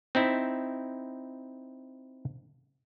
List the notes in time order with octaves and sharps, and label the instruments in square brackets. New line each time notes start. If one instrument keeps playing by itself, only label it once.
[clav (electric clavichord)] C4 D#4 E4